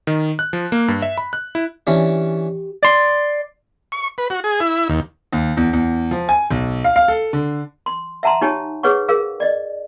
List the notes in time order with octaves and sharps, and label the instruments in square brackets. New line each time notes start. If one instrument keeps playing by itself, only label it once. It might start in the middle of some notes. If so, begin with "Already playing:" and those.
[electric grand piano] D#3
F#6
F3
A#3
G2
E5
B5
F#6
E4
[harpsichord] E3 C#4 D4 [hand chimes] G4
[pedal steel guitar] D5 C6
[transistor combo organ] C#6
B4
F#4
G#4
E4
D#2
[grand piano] D#2
E2
E2
F3
G#5
B1
F5
F5
A4
D3
[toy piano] C6
E5 F#5 A5 A#5 C6
D#4 G4 C#5 G#5 A5
G#4 B4 C#5 F#5 C#6
G#4 A#4 F5
D5 D#5